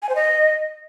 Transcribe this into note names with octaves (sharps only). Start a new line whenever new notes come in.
G#5
C5
D#5